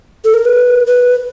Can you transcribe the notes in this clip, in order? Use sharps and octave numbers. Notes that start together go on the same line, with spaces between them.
A4
A#4
B4
B4